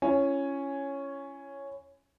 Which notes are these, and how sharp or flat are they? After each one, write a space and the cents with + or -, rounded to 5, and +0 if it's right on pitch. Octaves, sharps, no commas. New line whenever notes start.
C#4 +0 E4 +40 G#5 +0